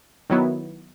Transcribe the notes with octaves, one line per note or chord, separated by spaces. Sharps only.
D#3 F#3 B3 E4